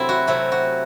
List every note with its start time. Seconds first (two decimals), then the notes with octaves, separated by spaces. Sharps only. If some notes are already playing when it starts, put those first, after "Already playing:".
Already playing: C3 F#3 A3 C4 E4
0.09 F#4
0.27 C3 F#3 A3 E4
0.52 F#4